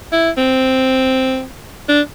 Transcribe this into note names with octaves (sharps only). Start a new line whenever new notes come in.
E4
C4
D4